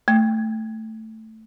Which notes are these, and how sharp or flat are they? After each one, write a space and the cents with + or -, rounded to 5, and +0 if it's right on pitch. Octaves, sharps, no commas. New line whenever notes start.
A3 +5